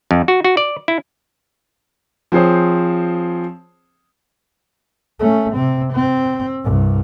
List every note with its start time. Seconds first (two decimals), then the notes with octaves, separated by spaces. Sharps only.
0.11 F2
0.28 F#4
0.44 F#4
0.57 D5
0.88 E4
2.32 F3 C4 G#4 C5 C#5
5.20 A3 C#4
5.52 C3 C4
5.93 C4
6.63 C2 G2